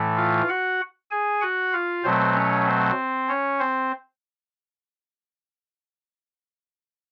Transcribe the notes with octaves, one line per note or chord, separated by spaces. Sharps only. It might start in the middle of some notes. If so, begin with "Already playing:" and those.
Already playing: A2 E3 A3
F4 F5
F#4 F#5
G#4 G#5
F#4 F#5
F4 F5
B2 F#3 A3 C4 C5
C#4 C#5
C4 C5
C#4 C#5
C4 C5